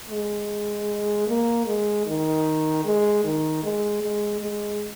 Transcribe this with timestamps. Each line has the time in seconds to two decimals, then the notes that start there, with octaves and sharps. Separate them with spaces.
0.10 G#3
1.27 A#3
1.66 G#3
2.06 D#3
2.85 G#3
3.24 D#3
3.63 G#3
4.02 G#3
4.41 G#3